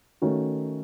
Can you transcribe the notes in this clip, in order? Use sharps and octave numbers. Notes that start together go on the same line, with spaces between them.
D#3 A3 C#4 F#4